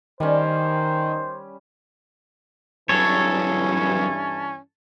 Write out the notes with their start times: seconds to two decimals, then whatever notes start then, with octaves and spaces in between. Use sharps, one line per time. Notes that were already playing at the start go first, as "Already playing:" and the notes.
0.20 D#3 G3 C#4 C5
2.89 E2 G2 E3 F#3 C#4 A4 C#5